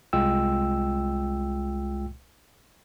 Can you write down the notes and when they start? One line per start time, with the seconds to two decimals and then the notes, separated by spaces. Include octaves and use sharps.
0.13 C2 G#3 F4 G5 E6